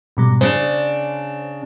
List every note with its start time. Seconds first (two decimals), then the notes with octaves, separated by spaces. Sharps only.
0.17 G#2 B2 G3
0.41 C#3 D4 C5